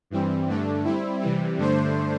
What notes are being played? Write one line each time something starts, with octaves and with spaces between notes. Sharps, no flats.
G2 E3 G3 C4
G2 D3 A3 D4
G3 C4 E4
C3 E3 G3
G2 D3 A3 D4 C5